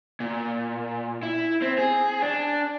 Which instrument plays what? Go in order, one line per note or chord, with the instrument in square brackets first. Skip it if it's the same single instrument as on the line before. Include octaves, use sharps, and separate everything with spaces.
[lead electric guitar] A#2
E4
C4
G#4
D4